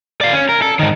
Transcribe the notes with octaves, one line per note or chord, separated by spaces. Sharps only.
D5 F5
C#4
A#4
A4
G#2 D#3